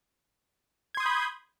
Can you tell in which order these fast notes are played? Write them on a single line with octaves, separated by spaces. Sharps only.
G#6 C6 D#6 G6 B5